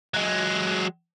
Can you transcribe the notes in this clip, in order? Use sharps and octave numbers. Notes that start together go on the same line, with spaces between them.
F#3 G#3